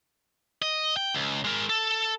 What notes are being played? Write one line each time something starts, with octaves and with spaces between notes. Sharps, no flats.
D#5
G5
C#2
G#3 A#4
A4